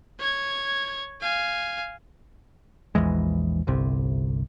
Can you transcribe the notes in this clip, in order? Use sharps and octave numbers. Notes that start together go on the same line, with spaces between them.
C#5 G#6
F5 G#5
A#1 E2 E3 G#3
G1 C2 C3